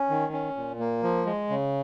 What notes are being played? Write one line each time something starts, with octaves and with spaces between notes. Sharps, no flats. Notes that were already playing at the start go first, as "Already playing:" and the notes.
Already playing: C#4
D#3
C#4
A#2
A#3
F3
G#3
C#3